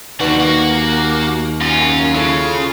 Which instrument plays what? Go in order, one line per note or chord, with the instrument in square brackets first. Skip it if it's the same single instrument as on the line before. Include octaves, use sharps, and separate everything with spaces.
[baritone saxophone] D#2 [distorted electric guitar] D3 G3 [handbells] D#4 B4 D5 [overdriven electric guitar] F#4
[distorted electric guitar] A#3 [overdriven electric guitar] F#4 [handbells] A#5
[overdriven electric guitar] F#2 C#4 [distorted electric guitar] F4
[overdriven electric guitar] C#3 [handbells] E4 A4 C7